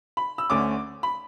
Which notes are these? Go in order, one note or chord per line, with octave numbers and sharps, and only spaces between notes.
B5
E6
D2 D3 A3 C#4 D6
B5